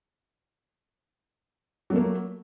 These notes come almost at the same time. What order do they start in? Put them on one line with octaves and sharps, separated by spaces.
F#3 A3 A#3